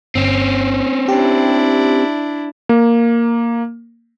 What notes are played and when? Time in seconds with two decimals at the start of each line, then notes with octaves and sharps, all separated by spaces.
0.15 G1 C4 C#4
1.08 D4 E4 G4
2.69 A#3